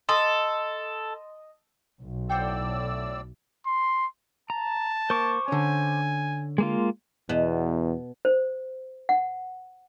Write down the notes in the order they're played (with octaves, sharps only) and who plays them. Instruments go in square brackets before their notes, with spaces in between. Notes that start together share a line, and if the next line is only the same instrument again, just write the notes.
[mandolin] A4 [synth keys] D#5 [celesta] C6
[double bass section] B1
[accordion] A2 D5 E6 [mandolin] C5 F#5 G5
[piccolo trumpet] C6
[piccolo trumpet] A5 [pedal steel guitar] A#5
[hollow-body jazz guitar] A#3 [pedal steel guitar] C5 C#6 D6
[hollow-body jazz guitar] D3 C#4 [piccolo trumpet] G#5
[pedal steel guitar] G#3 A#3 F4
[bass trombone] E2 [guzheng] B2
[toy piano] C5
F#5